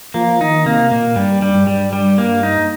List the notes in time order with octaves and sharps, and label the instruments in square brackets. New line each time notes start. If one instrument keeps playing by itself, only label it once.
[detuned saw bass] F3 [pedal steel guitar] A#3
[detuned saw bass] D#3 [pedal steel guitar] D#4
[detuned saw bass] C3 [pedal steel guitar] A#3
[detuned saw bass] A#2 [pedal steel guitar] A#3
[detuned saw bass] G2 [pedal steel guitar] G3
[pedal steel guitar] G3
[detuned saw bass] G2
[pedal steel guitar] G3
G3
A#3
D#4